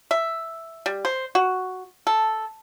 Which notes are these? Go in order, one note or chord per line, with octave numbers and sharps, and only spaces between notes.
E5
G3
C5
F#4
A4